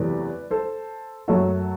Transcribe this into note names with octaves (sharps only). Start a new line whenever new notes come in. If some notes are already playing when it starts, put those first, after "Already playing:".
Already playing: E2 C3 F#3 A3 B4 D5
A4 C5
F#2 F#3 A3 F#4 A4